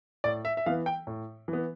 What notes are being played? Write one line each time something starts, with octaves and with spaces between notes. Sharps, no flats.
A2 D5
E5
E5
E3 B3 F5
G5
A2
E3
B3